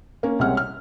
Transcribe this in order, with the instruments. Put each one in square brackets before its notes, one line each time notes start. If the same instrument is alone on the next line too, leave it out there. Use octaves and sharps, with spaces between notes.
[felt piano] A#3 C#4
C2 C3 G#3 C#5 F#5 F6
F6